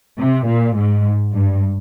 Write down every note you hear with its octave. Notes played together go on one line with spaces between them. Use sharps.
C3
A#2
G#2
G2